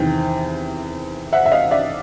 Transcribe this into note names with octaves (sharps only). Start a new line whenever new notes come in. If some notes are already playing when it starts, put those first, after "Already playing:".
Already playing: E2 C3 D#3 G5
E5 F#5
E5
D#5 F5
D5 E5